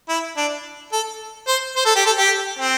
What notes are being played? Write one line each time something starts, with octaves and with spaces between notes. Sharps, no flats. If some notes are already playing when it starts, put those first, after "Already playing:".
E4
D4
A4
C5
C5
A4
G4
A4
G4
C4